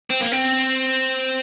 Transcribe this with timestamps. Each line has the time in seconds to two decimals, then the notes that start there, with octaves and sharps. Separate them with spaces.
0.10 C4
0.21 A#3
0.32 C4